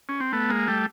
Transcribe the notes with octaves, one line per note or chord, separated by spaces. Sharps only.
C#4
C4
A3 B3
G#3 A#3
G3 A3